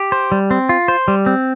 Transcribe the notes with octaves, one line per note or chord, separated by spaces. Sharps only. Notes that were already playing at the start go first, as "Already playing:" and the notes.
Already playing: G4
C5
G3
C4
F4
C5
G3
C4